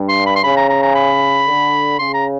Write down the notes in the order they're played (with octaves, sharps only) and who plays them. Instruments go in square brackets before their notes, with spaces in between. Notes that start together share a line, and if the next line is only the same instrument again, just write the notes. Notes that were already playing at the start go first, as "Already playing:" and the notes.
Already playing: [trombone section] G2
[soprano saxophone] C6
B5
C6
[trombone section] C#3 [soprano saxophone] B5
[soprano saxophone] A#5
A#5
A#5
B5
[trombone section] D3
[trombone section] C#3 [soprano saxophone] C6
[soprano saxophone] A#5